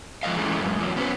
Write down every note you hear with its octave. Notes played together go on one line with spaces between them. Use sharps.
F3 G#3 A4 D#5 F5
E3 F#3 G#3 A3 C#4
F#2 G#3
E2 F#3
B3 C#4 A4 B4